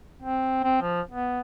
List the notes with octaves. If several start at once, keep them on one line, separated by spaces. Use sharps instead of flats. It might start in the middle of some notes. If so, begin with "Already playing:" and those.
C4
C4
F3
B3